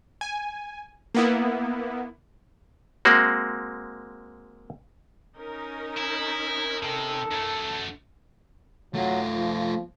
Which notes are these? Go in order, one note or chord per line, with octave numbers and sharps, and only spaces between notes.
G#5
A#3 B3 E4
G#3 A#3 C4 F#4
C#4 D#4 A#4
E4
C3 A4
F#2 A3
F#3 A3 F4
F3